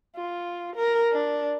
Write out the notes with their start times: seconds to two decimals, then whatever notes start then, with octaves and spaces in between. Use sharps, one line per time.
0.16 F4
0.76 A#4
1.12 D4